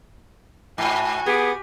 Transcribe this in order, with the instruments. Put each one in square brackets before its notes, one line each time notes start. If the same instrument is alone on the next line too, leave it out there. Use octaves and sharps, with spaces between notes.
[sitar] G#2 [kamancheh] F#4 G#5
[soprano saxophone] B3 [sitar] G4 [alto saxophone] G#4